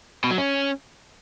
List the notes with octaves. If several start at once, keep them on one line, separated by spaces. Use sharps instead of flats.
B2
F#3
C#4